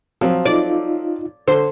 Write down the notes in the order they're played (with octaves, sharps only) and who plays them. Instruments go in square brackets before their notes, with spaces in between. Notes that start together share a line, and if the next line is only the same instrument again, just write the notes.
[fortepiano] F3 F#3 C4
[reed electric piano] D#4 F4 [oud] D5
[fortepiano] D3 [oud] C5